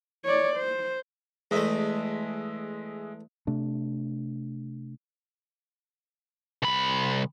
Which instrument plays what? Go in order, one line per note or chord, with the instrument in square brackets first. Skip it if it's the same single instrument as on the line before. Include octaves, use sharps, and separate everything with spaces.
[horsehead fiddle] C#5 D5
C5
[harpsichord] E2 A3 [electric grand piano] G#3 D#5 E5
[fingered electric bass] C3 A3 D4
[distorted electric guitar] C2 B5